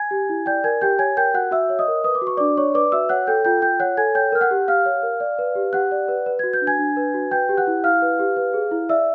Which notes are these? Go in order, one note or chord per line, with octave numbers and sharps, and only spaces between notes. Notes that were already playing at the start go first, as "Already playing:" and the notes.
Already playing: G#5 G#6
G4
E4
D5 G5 G6
A#4 G#5 G#6
G4 G5 G6
C#5 G#5 G#6
A#4 G5 G6
F#4 F#5 F#6
F#4 E5 E6
C#5
D#5 D#6
A#4
B4 D#6
D6
F#4
C#6
D4 D5 D6
C#5 D5 C#6
B4 D5 D6
F#4 E5 E6
C#5 F#5 F#6
A4 G5 G6
F4 G5 G6
F4 G5 G6
C#5 F#5 F#6
A4 G#5 G#6
C#5 G5 G6
A#4 F6
F#5 F#6
G4
G4 F5 F6
C#5
A#4
D5
B4
G4
G4 F#5 F#6
D5
B4
B4
F#4 G#6
G6
D4
G#5 G#6
D4
B4
F#4
B4 G5 G6
G4
F#5 F#6
E4
E4 F5 F6
B4
G4
B4
G#4
E4
D5 E5 E6